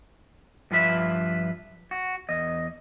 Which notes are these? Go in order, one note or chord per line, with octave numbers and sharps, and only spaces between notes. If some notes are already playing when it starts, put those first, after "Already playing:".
G2 F3 F4 B4 E5
F#4
E2 D#5